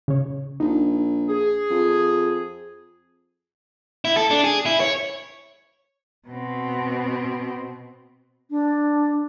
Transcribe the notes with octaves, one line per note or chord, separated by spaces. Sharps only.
C#3 C#5
A#1 D#4
G#4
F2
E4
A4
D4
G#4
E4
C#5
B2 C4
D4